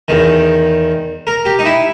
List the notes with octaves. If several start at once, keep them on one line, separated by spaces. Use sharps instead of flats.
E2 D#3
A#4
G4
D#4
E4